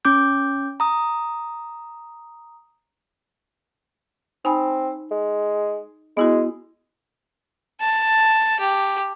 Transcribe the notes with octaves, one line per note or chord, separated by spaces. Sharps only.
C#4 D6 G6
A#5 D#6
C4 D#4 G#5 B5
G#3
G#3 B3 E4 F#4
A5
G4